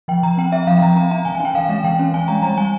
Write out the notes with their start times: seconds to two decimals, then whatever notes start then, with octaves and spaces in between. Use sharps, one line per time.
0.08 F3 G5
0.23 F3 A#5
0.37 C4 G5
0.52 C4 E5
0.67 F3 F5
0.82 F3 A#5
0.96 C4 A#5
1.11 C4 A#5
1.25 E3 G#5
1.35 G#5
1.40 C#4
1.45 G5
1.54 E3 F5
1.69 G#3 F5
1.84 E3 G5
1.99 C#4
2.14 E3 G#5
2.28 G#3 A#5
2.42 G3 A#5
2.57 G3 G#5